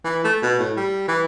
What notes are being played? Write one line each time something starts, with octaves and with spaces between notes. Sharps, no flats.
E3
A3
B2
A2
G3
E3